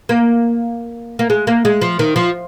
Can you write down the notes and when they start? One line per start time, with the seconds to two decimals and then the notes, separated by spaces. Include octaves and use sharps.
0.09 A#3
1.19 A#3
1.30 G#3
1.47 A#3
1.65 G#3
1.82 F3
1.99 D#3
2.16 F3